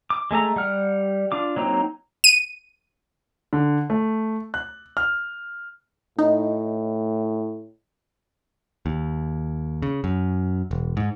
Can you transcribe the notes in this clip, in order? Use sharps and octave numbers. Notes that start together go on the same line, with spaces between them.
D6
G#3 A3 A4 A#5
G3 F#5 F6
D4 F4 D6
F#3 A#3 C4 D#4
D#7
D3
A3
F#6
F6
A2 D#4
D#2
C#3
F#2
E1
G#2